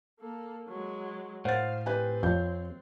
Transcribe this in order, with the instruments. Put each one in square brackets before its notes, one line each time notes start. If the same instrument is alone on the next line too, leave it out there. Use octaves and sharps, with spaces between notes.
[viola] A#3 A4
F#3 G#3
[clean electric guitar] A2 [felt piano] C5 A6 [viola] F5 [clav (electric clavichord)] F#5
[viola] C4 [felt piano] G4 B4 G#5
[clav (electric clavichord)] F2 [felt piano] C#5 G6